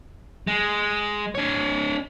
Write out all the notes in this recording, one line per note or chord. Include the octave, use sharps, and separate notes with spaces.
G#3
D4 C#5